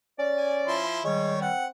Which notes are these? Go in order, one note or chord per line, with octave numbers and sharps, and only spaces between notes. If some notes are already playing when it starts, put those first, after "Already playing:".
C#4 D5
G#5
F3 E4 C6
D#3 G3 G#3 C#5
C4 F#5